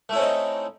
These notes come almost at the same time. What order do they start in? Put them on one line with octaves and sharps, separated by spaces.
A3 E4 C#4 C4 D#4